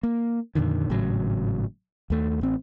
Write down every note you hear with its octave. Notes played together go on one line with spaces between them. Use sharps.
A#3
F2 A#2 D3 D#3
G#1 A2 C#3 F#3
D#2 A3
A1 C4